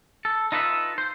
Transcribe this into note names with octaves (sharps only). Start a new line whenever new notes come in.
A4
D#4 F4 A4 B4 D#5 E5
C5